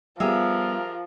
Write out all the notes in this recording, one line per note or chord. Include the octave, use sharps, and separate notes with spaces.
F3 G3 B3 G4 G#4 A#4 E5